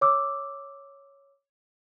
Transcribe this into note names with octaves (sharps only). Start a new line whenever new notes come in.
C#5 D6 E6